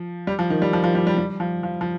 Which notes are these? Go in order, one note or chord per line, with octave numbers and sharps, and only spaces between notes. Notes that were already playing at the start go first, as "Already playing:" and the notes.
Already playing: F3
G3
F3
D#3
G3
F3
F3
G3
G3
G3
F3
F3
F3